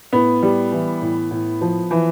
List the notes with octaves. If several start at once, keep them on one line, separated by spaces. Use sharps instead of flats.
A2 B3
G3
E3
A2
A2
F3
E3